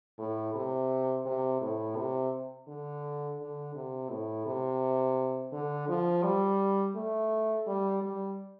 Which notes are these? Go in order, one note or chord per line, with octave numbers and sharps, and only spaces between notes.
A2
C3
C3
A2
C3
D3
D3
C3
A2
C3
D3
F3
G3
A3
G3
G3